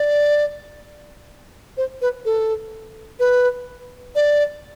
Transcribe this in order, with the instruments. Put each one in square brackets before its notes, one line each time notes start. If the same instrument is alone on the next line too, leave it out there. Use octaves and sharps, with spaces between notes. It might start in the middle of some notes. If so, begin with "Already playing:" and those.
Already playing: [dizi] D5
C5
B4
A4
B4
D5